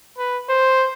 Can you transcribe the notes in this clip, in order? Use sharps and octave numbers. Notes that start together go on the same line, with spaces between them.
B4
C5